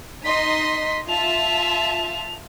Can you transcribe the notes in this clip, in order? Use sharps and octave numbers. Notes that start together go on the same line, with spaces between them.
D#4 D#5 C6 B6
F4 E5 A5 F7